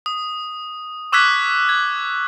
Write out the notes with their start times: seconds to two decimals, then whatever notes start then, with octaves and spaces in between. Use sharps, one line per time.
0.06 D#6
1.12 C#6 D6 E6 F#6 G#6 B6
1.69 G#6